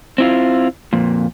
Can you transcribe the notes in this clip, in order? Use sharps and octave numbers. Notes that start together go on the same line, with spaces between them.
C4 E4 F4
F2 A#2